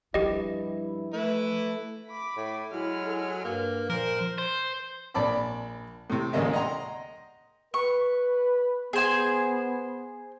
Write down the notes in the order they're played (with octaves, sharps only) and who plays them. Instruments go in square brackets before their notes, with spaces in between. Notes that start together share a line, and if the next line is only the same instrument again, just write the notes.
[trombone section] G2 E4 [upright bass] F3 [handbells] G4 D#5
[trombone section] A3 [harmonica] E4 B4
[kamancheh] B5 D6
[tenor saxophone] A2
[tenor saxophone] F#3 [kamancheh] G#3 F6 [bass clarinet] E4
[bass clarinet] A4
[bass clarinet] G2 [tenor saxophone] A#3
[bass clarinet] A#2 [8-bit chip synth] F3 [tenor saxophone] A#4 [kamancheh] C5
[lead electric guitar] C5
[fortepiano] A#1 D5 A5 B5 D6
A2 C3
A1 D2 G#3 A#3 D#5 E5
D#5 F#5 G5 A#5 C6
[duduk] B4 [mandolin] C#6
[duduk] B3 [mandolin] G#4 C5 G#5